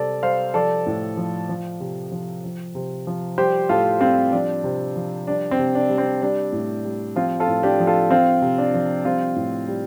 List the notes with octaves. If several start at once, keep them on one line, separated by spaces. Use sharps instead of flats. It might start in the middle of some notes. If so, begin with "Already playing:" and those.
Already playing: C3 G3 A4 D5
G3 C5 F5
F3 A4 D5
A2
F3
F3
C3
F3
F3
C3
F3
G3 G4 C5
A2 F4 A4
G3 C4 F4
F3 D4
C3
F3
G3 D4
C4
C3
D4
G3
C4
G3 D4
A2
G3
F3 C4 F4
F4 A4
A2
D4 G4
F3
F4 A4
F3 C4 F4
C3
D4
F3
G3 C4 F4
A2
G3